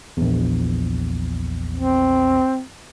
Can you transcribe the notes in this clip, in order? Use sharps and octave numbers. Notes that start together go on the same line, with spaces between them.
A#1 E2
C4